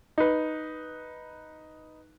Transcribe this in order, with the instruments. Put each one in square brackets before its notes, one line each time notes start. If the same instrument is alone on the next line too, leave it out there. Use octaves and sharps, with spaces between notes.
[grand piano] D#4 B4